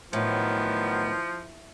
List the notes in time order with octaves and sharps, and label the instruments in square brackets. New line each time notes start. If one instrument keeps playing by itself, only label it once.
[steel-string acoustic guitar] A2 [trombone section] D#3 F#3 B3 [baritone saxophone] F3